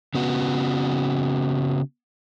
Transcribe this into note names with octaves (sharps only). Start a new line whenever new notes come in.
C#3 B3 F#4